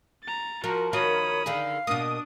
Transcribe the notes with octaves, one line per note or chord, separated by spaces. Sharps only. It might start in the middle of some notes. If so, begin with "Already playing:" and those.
A#5 A6
F3 F#4 A#4
D#3 F4 F#4 C#5 B5 D#6
D3 D#3 G#4 F5
B2 A#3 D4 D#6